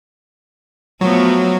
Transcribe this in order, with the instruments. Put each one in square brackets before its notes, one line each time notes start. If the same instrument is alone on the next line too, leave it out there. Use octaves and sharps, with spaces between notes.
[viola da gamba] F3 A3 B3 [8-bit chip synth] F#3